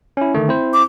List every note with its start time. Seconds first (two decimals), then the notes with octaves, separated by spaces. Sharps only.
0.17 C#4 E4
0.34 D3 D#3 A3
0.48 C4 E4 C5
0.73 D6